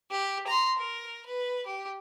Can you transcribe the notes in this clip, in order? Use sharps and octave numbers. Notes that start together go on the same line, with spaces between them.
G4
A#5 C6
A#4
B4
G4